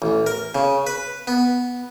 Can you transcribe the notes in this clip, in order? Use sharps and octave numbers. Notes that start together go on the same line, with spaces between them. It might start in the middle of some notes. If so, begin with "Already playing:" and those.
A1
A#4
C#3
B4
B3